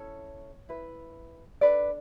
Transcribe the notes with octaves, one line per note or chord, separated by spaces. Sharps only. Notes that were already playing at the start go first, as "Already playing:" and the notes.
Already playing: C#4 E4 A4 C#5
E4 B4
D4 A4 B4 D5